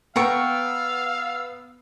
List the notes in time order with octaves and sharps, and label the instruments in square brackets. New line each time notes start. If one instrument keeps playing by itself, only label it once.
[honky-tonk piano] B3 [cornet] F5 [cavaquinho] G5 A#5 C#6 [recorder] E6